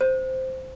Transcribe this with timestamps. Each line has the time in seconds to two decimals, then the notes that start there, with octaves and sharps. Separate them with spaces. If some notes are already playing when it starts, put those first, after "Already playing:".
0.01 C5